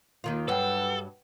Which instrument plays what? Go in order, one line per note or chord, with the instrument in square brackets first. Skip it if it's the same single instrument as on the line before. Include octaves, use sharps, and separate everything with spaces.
[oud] D#2 D#3 F4
[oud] G2 F#3 [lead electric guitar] A4 [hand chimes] B4 F#5 G5